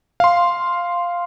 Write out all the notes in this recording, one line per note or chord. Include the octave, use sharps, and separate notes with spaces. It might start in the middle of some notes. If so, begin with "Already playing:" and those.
F5 C6